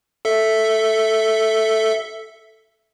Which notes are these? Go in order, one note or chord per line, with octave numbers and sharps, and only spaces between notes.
A4 E5